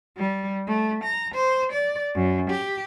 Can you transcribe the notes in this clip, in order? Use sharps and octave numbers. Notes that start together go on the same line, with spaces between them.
G3
A3
A#5
C5
D5
F#2
G4